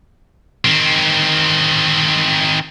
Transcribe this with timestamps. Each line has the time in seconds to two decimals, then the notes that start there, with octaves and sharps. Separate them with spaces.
0.65 D#3 C4